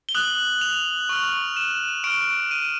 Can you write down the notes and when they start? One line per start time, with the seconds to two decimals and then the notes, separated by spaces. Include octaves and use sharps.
0.09 G7
0.15 D#6 F#6 F#7
0.61 F7
1.09 C#6 F6
1.57 E7
2.04 C#6 F6 D7
2.51 D#7